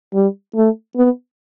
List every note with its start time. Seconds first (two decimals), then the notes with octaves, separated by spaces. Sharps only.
0.14 G3
0.55 A3
0.96 B3